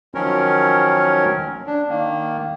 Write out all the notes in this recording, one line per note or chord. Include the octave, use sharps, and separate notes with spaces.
D#3 F3 F#3 C#4 A#4 C#5
D4
D#3 A#3